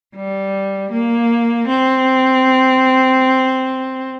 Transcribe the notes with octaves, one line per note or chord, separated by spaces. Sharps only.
G3
A#3
C4